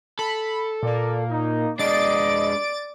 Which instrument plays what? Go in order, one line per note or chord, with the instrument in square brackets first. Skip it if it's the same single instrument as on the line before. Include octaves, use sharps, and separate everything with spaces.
[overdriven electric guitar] A4 [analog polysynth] B5
[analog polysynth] A#2 A#3 [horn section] D5
[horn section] D#4
[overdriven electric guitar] G#3 D4 [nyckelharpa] D5 [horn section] D#5 [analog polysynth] A6 D7